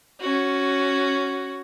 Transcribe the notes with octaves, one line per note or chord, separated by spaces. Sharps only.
C#4 F#4